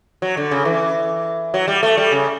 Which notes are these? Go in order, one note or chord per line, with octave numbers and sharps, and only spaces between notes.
F#3
D3
C#3
E3
F#3
G3
A3
G3
C#3